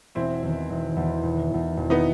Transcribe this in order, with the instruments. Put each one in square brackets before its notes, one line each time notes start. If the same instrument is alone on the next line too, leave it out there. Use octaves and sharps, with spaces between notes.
[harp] E1 [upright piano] C4 E4
[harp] E2 D#3
E1
E2 D#3
E1
E2 D#3
E1
[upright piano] B3 D#4